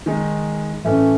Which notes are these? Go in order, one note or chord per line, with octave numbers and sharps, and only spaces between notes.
D#3 G#3 D#4
A2 E3 A3 C#4